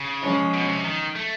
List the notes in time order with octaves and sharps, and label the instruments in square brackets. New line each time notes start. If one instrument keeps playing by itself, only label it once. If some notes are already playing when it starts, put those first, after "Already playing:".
Already playing: [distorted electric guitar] C#3
[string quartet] F3 G#3 C#4
[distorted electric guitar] B2
C3
D#3
A3